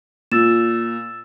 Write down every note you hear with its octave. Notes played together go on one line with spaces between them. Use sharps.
A#2 E6 A6 E7